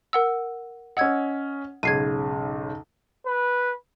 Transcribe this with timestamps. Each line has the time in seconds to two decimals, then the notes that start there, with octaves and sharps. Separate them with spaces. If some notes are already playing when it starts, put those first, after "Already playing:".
0.13 A#4 F#5 E6
0.97 C#4 D#5 F#5 E6 G#6
1.83 B1 G#2 C#3 G#6 C7 D#7
3.26 B4